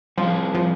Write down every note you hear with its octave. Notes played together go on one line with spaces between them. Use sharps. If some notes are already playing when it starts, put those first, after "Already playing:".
F3 G3 C4 F4 G#4
F3